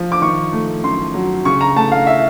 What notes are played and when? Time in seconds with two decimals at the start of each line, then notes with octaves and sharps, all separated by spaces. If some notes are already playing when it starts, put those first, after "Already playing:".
Already playing: F3
0.12 D6
0.21 D#3 C#6
0.53 A3
0.83 F#2 C6
1.14 F#3
1.45 C#3 C#6
1.61 A#5
1.76 A3 A5
1.92 F5
2.07 E5